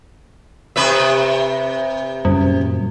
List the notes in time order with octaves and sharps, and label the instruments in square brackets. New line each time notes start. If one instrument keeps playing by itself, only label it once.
[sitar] C3 B4 E5
[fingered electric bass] F#2 A#2 C#3 [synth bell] G3